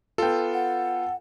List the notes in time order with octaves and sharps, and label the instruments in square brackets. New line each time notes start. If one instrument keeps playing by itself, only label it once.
[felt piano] B3 F4 [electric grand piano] A4 G5
[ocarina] F#5